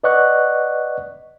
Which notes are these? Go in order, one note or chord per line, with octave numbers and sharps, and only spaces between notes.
B4 D5 D#5 F#5 C#6 F#6